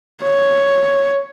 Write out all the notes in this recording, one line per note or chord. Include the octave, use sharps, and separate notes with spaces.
C#5